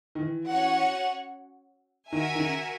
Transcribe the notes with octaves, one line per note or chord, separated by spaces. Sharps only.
D#3
E3
C#4 F#4 C#5 F#5
D#3 F#4 A#4 E5 G#5
D#3
C#3